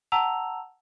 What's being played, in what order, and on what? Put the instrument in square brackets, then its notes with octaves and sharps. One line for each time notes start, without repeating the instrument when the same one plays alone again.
[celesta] F#5 A5 A#5 E6 F7